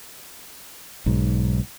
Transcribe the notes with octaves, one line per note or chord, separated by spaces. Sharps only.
B1 G#2